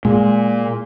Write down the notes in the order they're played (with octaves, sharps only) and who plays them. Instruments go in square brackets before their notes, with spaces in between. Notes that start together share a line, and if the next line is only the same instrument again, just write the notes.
[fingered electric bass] A#2 [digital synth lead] G#3